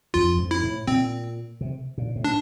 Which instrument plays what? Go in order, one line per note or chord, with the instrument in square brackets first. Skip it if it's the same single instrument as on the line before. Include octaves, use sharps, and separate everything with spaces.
[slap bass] F2 [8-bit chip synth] F4
[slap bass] F2
[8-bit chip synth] E4
[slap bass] A2
[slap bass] A#2 [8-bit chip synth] C4
[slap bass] C3
A#2
A2
[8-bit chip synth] D4